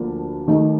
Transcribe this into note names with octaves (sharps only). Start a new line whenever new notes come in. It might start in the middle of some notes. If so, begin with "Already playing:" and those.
Already playing: D2 D3 F3 A#3 D4
D#2 D#3 A3 D#4